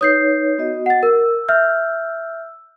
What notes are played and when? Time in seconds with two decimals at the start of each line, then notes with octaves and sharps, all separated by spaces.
0.01 D#4 B4 C#5 D#6 G6 C7
0.58 B3 F#4 D#5
0.86 F#5 A6
1.03 A#4 E6
1.48 E5 F6 G6